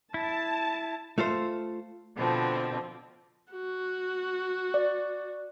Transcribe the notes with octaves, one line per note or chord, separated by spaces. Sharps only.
E4 A5
A3 F4 A4 C5
B2 D3 F3 C4
F#4
D5